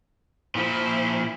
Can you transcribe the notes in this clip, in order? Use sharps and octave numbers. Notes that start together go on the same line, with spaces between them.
A#2 F3 E4 C5